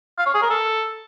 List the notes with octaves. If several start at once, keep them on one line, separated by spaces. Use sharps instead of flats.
F5
C#5
G#4
A#4
A4